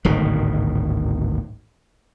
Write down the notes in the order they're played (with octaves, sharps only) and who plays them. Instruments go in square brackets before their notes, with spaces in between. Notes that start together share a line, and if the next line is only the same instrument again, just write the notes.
[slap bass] D1 G#1 B2 D#3